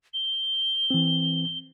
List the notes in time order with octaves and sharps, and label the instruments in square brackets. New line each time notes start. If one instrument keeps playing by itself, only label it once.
[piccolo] G7
[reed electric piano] E3 C4